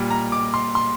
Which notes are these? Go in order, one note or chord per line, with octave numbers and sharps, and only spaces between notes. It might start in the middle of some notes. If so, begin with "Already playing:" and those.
Already playing: A#2 G3
A#5
D6
C6
C6